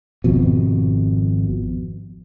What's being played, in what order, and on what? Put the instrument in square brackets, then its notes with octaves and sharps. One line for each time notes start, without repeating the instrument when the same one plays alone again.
[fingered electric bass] G#1 F2 B2